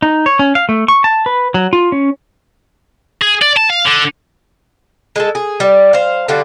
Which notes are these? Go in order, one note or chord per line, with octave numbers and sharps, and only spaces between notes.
D#4
C#5
C#4
F5
A3
C#6
A5
B4
F#3
F4
C#4
G#4
D5
A5
F5
D3
G#3 G#4 A4
G#4
G3
C5 F5
D3 G3 F4 F#4